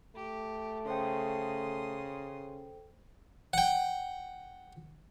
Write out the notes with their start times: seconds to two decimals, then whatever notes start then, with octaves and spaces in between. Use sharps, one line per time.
0.15 A3 G4
0.86 C#3 A4 C5 G5 C6 D#6
3.53 F#5 G5